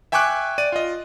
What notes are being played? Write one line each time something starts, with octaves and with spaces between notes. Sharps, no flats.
E5 G5 G#5 C#6 D6 F#6
D5 D#7
F4 D#5